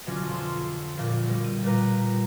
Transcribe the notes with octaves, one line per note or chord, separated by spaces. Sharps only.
B2 D3 F#3 C#4 D4 F4
F2 C6 E6
A#1 A#2
B2 G3
D#7
A#2 G3 B4 A#5